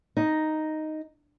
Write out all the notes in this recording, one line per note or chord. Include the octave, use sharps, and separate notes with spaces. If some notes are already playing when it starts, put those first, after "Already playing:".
D#4